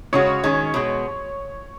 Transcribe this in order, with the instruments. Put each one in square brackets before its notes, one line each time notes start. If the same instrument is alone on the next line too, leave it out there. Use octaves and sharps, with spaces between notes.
[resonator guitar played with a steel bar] C#3 G#3 C#4 F#4 [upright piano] C#5
[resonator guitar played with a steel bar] D#3 G#3 C#4
B2 G#3 B3